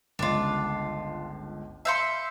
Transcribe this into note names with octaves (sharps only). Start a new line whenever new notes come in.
G1 C#2 D4 F4
E5 F5 C6 E6 G6 C#7